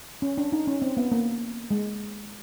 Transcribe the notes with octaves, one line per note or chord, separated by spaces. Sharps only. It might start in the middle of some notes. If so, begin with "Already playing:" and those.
C#4
D4
D#4
C#4
C4
B3
A#3
G#3